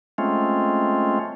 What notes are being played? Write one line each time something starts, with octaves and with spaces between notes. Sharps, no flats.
G#3 A3 C4 C#4 F4